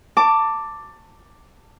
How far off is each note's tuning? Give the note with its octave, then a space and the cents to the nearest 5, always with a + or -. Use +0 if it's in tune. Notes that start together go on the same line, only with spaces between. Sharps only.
A5 +20 D6 +0